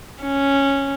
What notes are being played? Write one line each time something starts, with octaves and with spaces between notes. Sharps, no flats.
C#4